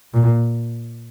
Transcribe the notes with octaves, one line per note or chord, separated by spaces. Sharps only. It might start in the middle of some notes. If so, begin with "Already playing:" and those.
A#2